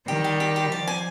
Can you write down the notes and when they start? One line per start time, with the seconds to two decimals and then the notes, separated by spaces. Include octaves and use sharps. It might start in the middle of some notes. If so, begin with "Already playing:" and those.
0.08 D#3 G3 G4
0.24 G4
0.40 G4
0.56 G4
0.71 F3 D5
0.87 G#5